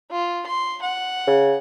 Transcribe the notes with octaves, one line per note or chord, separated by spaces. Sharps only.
F4
C6
F#5
C#3